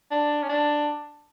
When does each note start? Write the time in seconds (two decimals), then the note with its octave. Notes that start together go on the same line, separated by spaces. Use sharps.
0.11 D4
0.43 C#4
0.49 D4